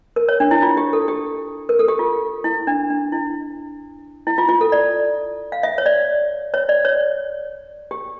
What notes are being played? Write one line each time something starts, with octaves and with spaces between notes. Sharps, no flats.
A#4
C#5
D4
E4
F4
G4
A4
G4
A#4
A4
G4
F4
E4
D4
D4
E4
E4
F4
F4
A4
D5
F5
E5
C#5
D5
C#5
D5
C#5
G4